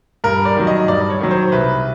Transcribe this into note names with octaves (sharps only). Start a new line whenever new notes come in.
G2 A#4
D5
D#3 F#3
D#5
G2 D5
C#5
D#3 F#3
C5
C2 B4